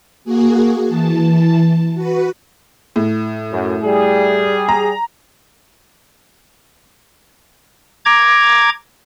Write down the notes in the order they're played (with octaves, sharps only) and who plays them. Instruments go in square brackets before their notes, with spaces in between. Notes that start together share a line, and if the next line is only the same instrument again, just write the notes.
[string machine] A#3 F#4 G#4
E3 A5
F#4 B4
[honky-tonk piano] A2
[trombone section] F#2
G3 G#4
[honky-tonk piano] A#5
[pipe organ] A#5 D6 G#6